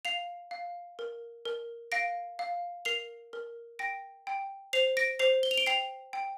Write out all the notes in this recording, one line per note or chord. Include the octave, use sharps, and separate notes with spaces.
F5 C7 F7
F5
A#4
A#4
F5 A#6 D7
F5
A#4 C7 F7
A#4
G5 A#6 D7
G5
C5 C7 F7
A#6 D7
C5 C7 F7
G7
F7
D7 G7
G5 C7 F7
G5